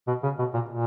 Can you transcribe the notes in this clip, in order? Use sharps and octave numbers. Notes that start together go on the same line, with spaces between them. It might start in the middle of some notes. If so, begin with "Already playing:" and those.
B2
C#3
B2
A#2
A#2